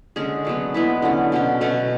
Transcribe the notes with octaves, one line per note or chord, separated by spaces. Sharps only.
D3 G#3 C#4 G#4
D3 F#3 B3
G#3 B3 E4 B4
D3 F#3 C#4
B2 F#3 C#4
B2 A3 C#4 F#4